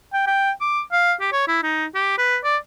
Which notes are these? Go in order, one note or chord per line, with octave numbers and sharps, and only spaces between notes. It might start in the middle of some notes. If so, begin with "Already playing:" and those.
G5
G5
D6
F5
G4
C#5
E4
D#4
G4
B4
D5